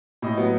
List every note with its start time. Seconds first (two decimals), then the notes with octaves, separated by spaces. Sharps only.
0.22 A2 D#5
0.37 F#3 B3